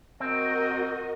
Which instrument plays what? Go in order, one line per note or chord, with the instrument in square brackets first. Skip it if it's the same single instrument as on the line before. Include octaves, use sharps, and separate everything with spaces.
[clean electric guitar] C4 [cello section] F#4 A#4 D#5